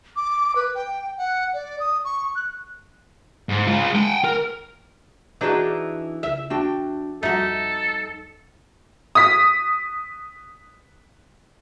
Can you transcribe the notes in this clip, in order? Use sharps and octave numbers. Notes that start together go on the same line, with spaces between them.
D6
B4
G5
F#5
D5
D#6
C#6
F#6
G#2
G#3 F4
F#5 G5
A#4
E3 D4 D#4 F#4 G#4 D5
C#2 E5
E2 D4 F#4 G5
F2 G3 D#4 F#4 A4 E5
D#6 B6